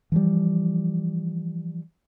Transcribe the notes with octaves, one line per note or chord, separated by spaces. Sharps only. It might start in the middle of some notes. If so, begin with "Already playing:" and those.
E3 F3 G3